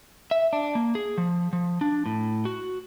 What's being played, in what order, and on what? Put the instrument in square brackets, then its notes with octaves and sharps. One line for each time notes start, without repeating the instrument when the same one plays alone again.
[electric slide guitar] E5
D4
A#3
G#4
F3
F3
D4
A2
F#4